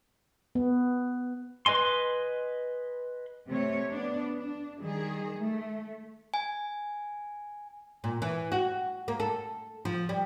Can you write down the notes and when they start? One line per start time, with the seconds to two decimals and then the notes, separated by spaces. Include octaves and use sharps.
0.55 B3
1.66 B4 D#5 G#5 C6
3.49 C3 A3 C#5
3.90 B3 D4
4.36 D4
4.81 D#3 G3 G#4
5.39 A3
6.34 G#5
8.04 A#2
8.22 E3
8.52 F#4
9.08 A#3
9.20 A4
9.85 F3
10.09 G3